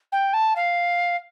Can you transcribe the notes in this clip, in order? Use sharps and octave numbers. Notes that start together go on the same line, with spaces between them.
G5
A5
F5